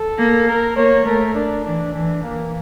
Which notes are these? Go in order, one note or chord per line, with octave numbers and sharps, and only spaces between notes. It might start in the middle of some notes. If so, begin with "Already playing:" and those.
Already playing: A4
A#3
A#4
A#3 C#5
A3 A#4
D4
E3 D4
E3 D4
E3 A#3